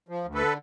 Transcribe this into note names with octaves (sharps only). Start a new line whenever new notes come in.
F3
D2
A4 B4
D3